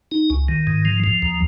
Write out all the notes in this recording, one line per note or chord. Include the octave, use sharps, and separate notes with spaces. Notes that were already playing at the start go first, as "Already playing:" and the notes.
D#4
C#2
D#3
G#2
F3
F3
D#2